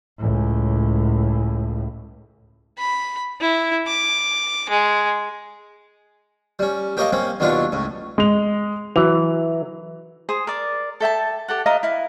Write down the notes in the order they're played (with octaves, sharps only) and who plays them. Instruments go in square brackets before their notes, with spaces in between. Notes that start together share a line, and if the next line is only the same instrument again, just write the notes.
[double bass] C#2 A2
[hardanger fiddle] B5
E4
D6
G#3
[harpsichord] G3 C#4
G4 A#4 C#5 D#5 F5 A5
A#3 C4 C#4
D#2 B2 F#3 D4 F4 C#6
C#2 A2
[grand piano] G#3 F7
[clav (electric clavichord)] E3 [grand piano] F#3 F7
[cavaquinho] G#4 C5 D#6
A#4 D5
A4 E5 G5 A5
G4 A4 F#5
E4 D#5 F5 A#5
E4 F5